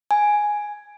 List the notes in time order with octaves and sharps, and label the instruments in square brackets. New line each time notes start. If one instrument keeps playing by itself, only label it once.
[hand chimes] G#5